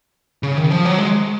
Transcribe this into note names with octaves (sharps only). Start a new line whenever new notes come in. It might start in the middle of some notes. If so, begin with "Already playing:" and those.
C#3
D#3
F3
F#3
G#3